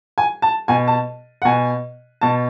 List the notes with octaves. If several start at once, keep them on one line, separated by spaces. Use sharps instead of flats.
G#5
A5
B2 G#5
A5
F#5
B2 G#5
B2 A5